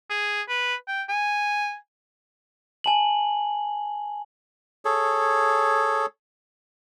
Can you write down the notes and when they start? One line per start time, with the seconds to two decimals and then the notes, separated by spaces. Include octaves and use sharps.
0.10 G#4
0.49 B4
0.88 G5
1.09 G#5
2.84 G#5 A5 F#7
4.85 G#4 A4 C#5